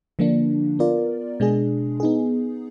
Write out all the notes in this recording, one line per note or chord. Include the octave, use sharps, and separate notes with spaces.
D3 F3 A#3 D4
B3 F4 A#4 D5
B2 G#3 D4 G#4
B3 D#4 G#4